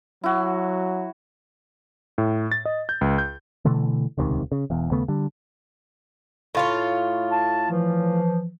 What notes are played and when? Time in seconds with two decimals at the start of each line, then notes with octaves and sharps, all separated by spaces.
0.24 F#3 E4 F#4
2.18 A2
2.52 A6
2.65 D#5
2.89 G6
3.01 C#2
3.18 G6
3.65 B2 D3 E3 A3
4.18 D#1 C#2 C3 D#3
4.52 C#3
4.70 E1 E2
4.91 D#2 C#3 A3 B3
5.08 D3 G3
6.55 A2 F4 C#5
7.32 A5
7.71 E3 F3